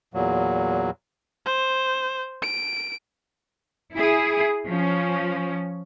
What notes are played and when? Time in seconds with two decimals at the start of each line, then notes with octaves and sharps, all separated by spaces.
0.14 E2 A#2 F#3
1.46 C5
2.43 D7
3.95 E4 G#4
4.67 F3 C#4